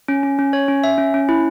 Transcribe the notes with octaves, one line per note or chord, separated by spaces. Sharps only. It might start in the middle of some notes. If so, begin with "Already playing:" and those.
C#4
C#4
C#4
C#5
C#4
E5
C#4
C#4
E4